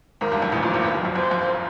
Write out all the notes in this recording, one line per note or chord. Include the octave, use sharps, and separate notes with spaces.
G#1 G#2 A#4
G1 G2
F2
A1 A2
A#1 A#2
G#1 G#2
G1 G2 B4
F#1 F#2
F2
F2 C5
F2